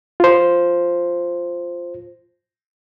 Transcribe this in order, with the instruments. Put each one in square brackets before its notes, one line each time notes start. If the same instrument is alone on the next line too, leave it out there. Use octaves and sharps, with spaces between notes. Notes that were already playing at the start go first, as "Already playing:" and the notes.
[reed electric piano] F4 C5